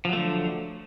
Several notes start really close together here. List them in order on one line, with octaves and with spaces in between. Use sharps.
F3 F#3 A3 D3